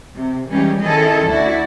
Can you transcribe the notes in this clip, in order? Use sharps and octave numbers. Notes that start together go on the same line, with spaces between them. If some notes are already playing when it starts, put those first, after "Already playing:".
C3
E3 G3 G#3 C#4 D#4 G4
D#3 C#4 E4 G#4 A4 D#5
D2 E4 F#4 D5